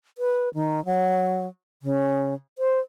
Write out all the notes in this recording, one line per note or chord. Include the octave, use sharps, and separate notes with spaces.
B4
D#3
F#3
C#3
C5